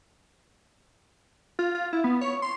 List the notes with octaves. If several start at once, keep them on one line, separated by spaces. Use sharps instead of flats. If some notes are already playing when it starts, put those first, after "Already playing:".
F4
F4
E4
B3
C#5
C6